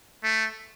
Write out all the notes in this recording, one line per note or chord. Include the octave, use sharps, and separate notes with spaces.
A3